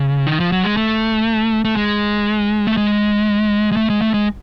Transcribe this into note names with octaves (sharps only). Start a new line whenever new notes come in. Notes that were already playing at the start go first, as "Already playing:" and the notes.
Already playing: C#3
D#3
F3
F#3
G#3
A3
A3
G#3
A3
G#3
G#3
A3
G#3
A3
G#3